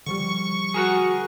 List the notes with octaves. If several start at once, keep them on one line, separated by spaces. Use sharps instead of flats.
D3 F3 G3 C#6
F#4 G#4 A#4 F#5